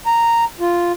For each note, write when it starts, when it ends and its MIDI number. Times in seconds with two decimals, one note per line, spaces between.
0.06 0.44 82
0.60 0.92 65